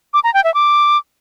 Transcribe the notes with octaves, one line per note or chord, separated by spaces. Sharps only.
D6
A#5
G5
E5
D6